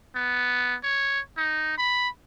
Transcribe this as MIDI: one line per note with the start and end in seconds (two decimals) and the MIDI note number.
0.16 0.76 59
0.83 1.20 73
1.37 1.76 63
1.78 2.08 83